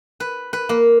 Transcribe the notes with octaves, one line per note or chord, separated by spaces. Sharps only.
B4
B4
A#3